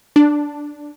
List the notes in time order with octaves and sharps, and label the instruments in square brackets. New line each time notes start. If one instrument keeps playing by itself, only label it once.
[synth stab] D4